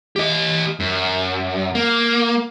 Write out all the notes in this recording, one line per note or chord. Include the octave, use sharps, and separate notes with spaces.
G4 D#5
F#2
A#3